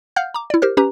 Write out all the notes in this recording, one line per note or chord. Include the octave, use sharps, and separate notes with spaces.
F5 F#5 F6 G6
A#5 D6
E4 D5
G4 A#4 C5 F6
C#4 G4 B4 A#5